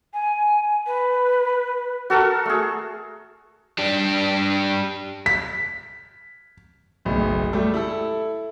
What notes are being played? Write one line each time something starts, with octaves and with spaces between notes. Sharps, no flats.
G#5
B4
F#4 A4 A#4
A3 G#4
G3 D4
B6
F#1 B1 A2
G3 A3 G4 A4
E4 A4